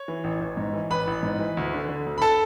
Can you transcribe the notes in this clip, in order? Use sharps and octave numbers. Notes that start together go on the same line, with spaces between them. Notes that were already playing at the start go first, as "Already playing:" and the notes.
Already playing: C#5
E3
A1
A1
G#2
E3
A1 B4 B5
A1
G#2
E3
D2
D3
D3
D2
B5
A4 A5